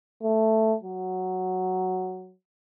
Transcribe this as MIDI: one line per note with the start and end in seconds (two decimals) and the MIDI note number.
0.23 0.75 57
0.83 2.34 54